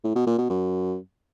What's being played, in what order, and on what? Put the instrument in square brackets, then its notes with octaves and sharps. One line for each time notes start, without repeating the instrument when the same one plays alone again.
[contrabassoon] A2
B2
A#2
B2
F#2